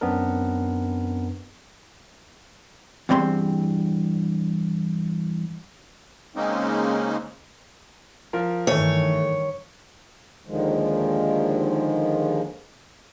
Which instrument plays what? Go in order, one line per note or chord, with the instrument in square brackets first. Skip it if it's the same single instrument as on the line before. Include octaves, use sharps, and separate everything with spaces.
[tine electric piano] F#2 B3 C4 D4 A#4
[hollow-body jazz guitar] E2 G2 C4 B5 C6
[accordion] C#3 G#3 A#3 C4 C#4 D#4
[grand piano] F3 F4 A#4
[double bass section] G2 D#3 [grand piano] E3 A3 [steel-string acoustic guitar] C#5
[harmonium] D#2 D3 D#3 F3 G#3